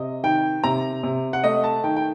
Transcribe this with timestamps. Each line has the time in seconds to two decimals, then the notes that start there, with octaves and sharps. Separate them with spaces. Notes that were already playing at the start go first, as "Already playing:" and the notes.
Already playing: C3 D#5
0.23 D#3 G5
0.64 C3 A#5
1.03 C3
1.33 F#5
1.44 A3 D#5
1.64 A5
1.84 D#3 G5
1.96 G5